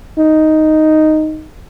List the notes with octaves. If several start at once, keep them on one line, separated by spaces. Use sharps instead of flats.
D#4